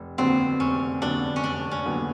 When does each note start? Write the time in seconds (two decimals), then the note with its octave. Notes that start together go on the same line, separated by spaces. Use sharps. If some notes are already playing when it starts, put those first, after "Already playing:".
Already playing: F1
0.18 D#2 D3 F#3 B3 C4
0.60 F1 C#4
1.02 D#2 D3 F#3 B3 D4
1.36 C#4
1.44 F1 D4
1.71 C#4
1.85 D#2 D3 F#3 B3